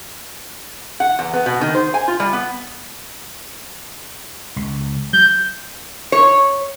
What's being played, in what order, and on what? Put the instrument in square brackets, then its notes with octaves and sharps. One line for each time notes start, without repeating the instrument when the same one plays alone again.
[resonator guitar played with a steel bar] F#5
E2
B3
B2
D#3
C5
G#5
F4
G3
B3
[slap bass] C#2
[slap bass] F#3 [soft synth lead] G6
[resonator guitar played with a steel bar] C#5